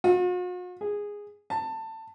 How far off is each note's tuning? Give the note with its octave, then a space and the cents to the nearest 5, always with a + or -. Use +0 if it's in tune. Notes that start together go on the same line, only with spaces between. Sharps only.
F#4 -45
G#4 -10
A5 +20